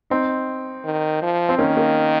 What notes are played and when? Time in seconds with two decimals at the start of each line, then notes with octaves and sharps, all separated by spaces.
0.10 C4 D#4
0.85 D#3
1.22 F3
1.49 C4
1.58 D#3 A#3 C#4
1.77 A#3